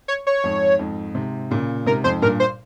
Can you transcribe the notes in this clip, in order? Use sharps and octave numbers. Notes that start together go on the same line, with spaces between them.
C#5
C#5
F2 G#2
F2 G#2
G#2 C3
A#2 C#3
G#2 C3 A#4
F2 G#2 C5
G2 A#2 A#4
C5